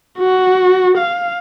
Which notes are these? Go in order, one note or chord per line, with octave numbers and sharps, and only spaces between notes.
F#4
F5